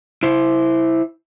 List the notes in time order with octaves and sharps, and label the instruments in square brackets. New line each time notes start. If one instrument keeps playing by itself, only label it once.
[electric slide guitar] E4 C5